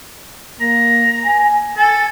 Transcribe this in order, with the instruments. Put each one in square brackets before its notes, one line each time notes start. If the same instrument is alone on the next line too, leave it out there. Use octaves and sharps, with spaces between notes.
[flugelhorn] A#3 [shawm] A#5
[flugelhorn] G#5
[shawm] A4 [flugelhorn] G#5